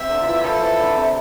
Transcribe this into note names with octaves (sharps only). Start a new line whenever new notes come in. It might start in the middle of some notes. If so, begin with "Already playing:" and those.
Already playing: C4 E5
D3 D4
F4
E3 E4
F3 F4 A4
E3 E4
D3 D4
C3 C4